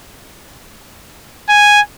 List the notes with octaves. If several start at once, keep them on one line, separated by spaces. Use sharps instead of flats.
G#5